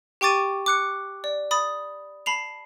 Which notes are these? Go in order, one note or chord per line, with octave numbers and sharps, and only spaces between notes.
G4 G5 C#6 D6 A6 D#7
D6 F#6 C#7
D5
B5 D#6 A6
A5 B5 C7 F7